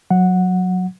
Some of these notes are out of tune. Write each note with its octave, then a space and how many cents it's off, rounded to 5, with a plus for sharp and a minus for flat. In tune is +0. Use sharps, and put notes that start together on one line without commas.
F#3 -15 F#5 -10